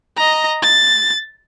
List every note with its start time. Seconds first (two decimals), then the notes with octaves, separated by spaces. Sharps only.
0.17 D#5 A#5
0.62 A6